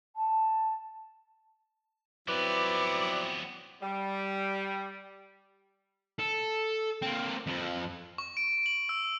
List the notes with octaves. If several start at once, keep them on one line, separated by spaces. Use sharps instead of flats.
A5
F3 F#3 B3 C4 E4 B4 D5
G3
A4
A#3 C4
F2 F3
C#6
D7
F#7
E6